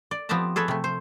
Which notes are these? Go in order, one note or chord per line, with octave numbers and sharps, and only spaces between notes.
D5
F3 B3 C4 G4 A5 A#5
G#4 A4 B4 C#5
C3 A3
C5